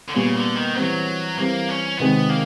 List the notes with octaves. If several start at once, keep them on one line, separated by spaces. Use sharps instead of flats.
D3
A#2 C#3 G3 B3
D3
D#3
E3 F#3 G3 C4
E3 G3 A#3 C4
C#4
C3 D#3 G#3 B3 C4
A#3